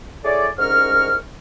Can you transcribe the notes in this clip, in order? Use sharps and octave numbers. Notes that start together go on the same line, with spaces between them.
E4 G#4 A4 C#5 D5
C2 G#2 C#4 A#4 C#6 F6